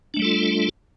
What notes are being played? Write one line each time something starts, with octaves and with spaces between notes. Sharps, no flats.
G3 A3 D4 F4 A4